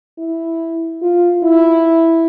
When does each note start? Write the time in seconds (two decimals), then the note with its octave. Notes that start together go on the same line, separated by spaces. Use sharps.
0.18 E4
1.02 F4
1.43 E4